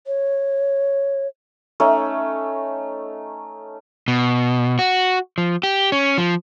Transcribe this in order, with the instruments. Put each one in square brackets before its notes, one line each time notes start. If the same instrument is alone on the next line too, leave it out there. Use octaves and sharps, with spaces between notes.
[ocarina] C#5
[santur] A3 C#4 D#4 C#5
[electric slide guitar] B2
F#4
F3
G4
C#4
F3